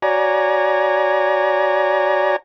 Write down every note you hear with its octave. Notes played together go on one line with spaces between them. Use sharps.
F#4 C#5 D5 G#5 A#5